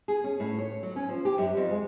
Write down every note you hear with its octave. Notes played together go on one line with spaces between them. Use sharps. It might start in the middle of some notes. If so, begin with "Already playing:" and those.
G#4
C#4
A2
C#5
F#3
C#4
F3
G4
F#2
F2
G#3